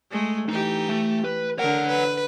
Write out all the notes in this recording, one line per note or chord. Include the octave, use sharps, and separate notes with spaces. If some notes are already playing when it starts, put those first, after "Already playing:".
G#3 A3
E3 D#4 G4
A3
B4
D3 A#4 C#5 F#5
B4